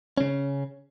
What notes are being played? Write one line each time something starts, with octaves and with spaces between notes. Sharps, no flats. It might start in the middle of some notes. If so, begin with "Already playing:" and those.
C#3 C#4